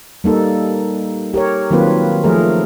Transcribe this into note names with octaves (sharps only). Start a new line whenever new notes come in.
G3 A#3 D#4 A4
G4 A#4 C#5
D#3 F#3 A#3 C4 F4 B4
F3 A3 G#4 A#4